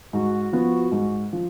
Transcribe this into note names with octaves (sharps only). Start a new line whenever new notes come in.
G#2 F#4
F3 B3
G#2
F3